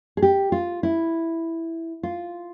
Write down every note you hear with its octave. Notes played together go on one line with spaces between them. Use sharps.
G#4
G4
F4
E4
F4